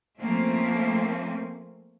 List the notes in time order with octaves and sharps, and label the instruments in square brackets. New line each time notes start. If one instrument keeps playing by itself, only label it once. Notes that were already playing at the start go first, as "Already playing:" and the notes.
[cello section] F3 A3 A#3 C4 C#4